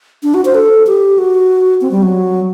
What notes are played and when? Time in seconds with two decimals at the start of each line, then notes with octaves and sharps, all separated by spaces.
0.23 D4
0.34 F#4
0.45 C5
0.55 A4
0.87 G4
1.18 F#4
1.81 C4
1.91 G3
2.02 F#3